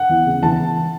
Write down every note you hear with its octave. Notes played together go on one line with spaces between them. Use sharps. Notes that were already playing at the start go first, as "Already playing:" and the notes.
Already playing: F#5
E3 B3 E4
C#3
E3 B3 E4 A5